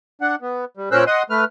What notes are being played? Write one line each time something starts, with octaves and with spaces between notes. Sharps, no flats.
D4 F#5
B3
G3
A#2 C#4 A#4 C5 E6 F#6
D#5 F#5 C6 D#6
A3 B4 F6